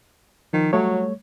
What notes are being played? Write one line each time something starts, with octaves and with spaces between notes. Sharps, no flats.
D#3 F3
F#3 G3 A3 C#5